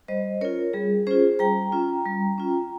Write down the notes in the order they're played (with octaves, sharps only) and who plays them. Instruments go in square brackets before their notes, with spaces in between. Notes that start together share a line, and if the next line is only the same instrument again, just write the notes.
[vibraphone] G3 C5 D#5
C#4 F4 A#4 C#5
G3 G#4
C#4 F4 G#4 C5
G3 G5 A#5
C#4 F4
G3
C#4 F4